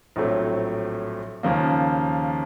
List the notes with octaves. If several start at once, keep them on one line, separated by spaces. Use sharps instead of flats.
A#1 A2 F#3 A3 C4
D#2 C#3 F3 A#3